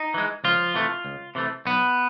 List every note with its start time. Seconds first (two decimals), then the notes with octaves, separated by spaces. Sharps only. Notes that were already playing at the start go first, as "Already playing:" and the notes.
Already playing: D#4
0.14 E3 G#3
0.44 C#2 F3 F4
0.74 C3 E3 A3
1.05 C#2
1.35 C3 E3 A3
1.65 B1 B3